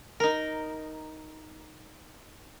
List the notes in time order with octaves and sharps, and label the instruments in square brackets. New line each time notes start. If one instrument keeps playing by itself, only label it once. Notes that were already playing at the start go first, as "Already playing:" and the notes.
[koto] D#4 A#4